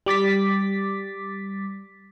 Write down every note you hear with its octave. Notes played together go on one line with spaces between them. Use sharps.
G3 D6 A6 B6